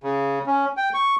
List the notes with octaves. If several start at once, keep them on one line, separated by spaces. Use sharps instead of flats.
C#3
C#4
G5
C#6